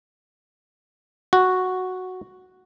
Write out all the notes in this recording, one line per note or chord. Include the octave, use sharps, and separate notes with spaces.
F#4